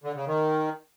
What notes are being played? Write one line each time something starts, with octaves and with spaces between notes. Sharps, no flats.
D3
C#3
D#3